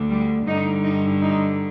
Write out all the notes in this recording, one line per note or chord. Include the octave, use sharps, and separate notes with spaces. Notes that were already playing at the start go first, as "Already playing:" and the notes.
Already playing: D2 D3
G3
G2 D3 D#4
D#4
D#4